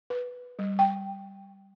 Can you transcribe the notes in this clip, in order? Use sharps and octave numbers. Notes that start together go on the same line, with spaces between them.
B4
G3
G5